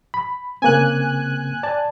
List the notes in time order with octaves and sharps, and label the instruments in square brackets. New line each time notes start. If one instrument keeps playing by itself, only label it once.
[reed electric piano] B5
[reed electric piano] C#3 A#3 C4 [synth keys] G#5 F#6
[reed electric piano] D5 A5